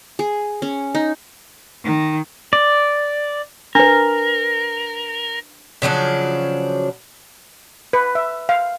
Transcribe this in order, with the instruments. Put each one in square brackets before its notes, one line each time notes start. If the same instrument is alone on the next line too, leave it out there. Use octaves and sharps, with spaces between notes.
[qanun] G#4
C#4
D#4
[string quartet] D#3
[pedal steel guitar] D5
[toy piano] D4 B4 [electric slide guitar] A#4
[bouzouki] C#3 F3 F#3 D4
[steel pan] B4
E5
F5